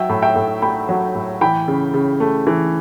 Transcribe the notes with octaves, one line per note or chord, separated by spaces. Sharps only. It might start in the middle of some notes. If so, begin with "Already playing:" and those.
Already playing: F#3 E5 G5
A2
E5 G5
A2
A3 G5 B5
F#3
A2
E3 G5 B5
C#3
C#3
A3
E3